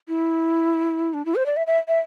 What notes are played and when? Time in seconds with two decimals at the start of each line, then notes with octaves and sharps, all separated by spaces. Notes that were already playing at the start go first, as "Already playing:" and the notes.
0.09 E4
1.14 D4
1.25 E4
1.35 C5
1.46 D5
1.57 E5
1.67 E5
1.88 E5